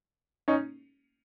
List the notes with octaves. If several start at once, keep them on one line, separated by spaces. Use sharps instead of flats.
C#4 D#4